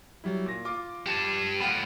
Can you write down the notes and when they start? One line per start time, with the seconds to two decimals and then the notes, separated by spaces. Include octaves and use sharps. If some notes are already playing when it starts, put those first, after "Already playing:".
0.24 F#3 G3 E4
0.46 A#2 A#6
0.65 F4 D6
1.06 G4 A5
1.60 A2 F4 F#5 G5 B5